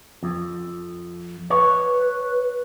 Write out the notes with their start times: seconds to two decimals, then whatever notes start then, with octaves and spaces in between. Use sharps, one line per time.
0.23 F2
1.50 B4 C#5